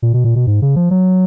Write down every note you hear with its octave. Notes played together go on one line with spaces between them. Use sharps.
A#2
B2
A#2
B2
G#2
C#3
F3
F#3